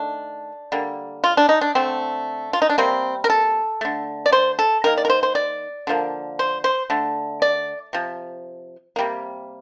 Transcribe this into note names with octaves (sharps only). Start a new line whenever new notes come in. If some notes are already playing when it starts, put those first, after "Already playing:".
Already playing: D#3 A3 D4
D3 G3 A#3
F4
D4
D#4
D4
D3 A3 C4
F4
D#4
D4
C3 G3 A#3 C4
A#4
A4
D3 A3
D5
C5
A4
D#3 A#3 A#4
D5
A#4
C5
C5
D5
D3 F3 A#3
C5
C5
D3 A3
D5
C3 F3
C3 G3 A#3